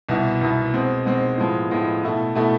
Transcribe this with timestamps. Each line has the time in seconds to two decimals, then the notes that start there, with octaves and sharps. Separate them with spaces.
0.09 C2 B2 B3 E4
0.41 C2 B2 B3 E4
0.73 B2 G#3 C4
1.05 B2 G#3 C4
1.38 A2 F3 G#3 B3
1.70 A2 F3 G#3 B3
2.03 B2 A3 E4
2.35 B2 A3 E4